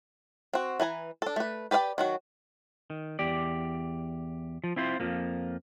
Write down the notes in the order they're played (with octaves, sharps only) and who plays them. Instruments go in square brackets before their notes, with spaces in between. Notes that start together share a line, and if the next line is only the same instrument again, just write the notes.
[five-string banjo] C4 F#4
E3 B4 G#5 A#5
D4 A4
A3 B4
G4 B4 D5 F5 G5
D#3 F#3 F#4
[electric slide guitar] D#3
E2 G4 D5
F3
C4 E4 F4 C5
F2 F3 A#3